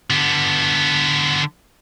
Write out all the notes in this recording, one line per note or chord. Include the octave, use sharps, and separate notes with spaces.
D3 B3